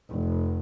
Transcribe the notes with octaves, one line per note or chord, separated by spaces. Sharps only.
F1